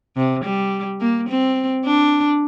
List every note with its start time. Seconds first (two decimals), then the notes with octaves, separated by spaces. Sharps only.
0.17 C3
0.44 G3
1.01 A#3
1.29 C4
1.85 D4